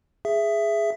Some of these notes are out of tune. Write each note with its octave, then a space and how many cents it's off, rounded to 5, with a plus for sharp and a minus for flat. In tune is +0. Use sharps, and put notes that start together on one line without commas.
G#4 +0 E5 +15